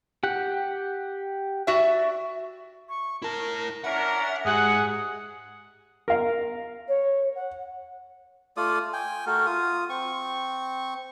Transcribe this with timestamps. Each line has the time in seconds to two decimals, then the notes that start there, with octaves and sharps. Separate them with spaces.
0.23 G4 F#5
1.67 F#4 D5 E5
2.89 C#6
3.22 E4 A#4 A5
3.84 C#4 D4 A#4 E5 F#5
4.46 G#2 G4 G#4 F#5
6.08 A#4 F5
6.88 C#5
7.35 F#5
8.57 A3 F4 D5 D#6
8.93 G5 G#5
9.26 A3 F#4 A#4
9.46 F4 D#6
9.89 C4 C#6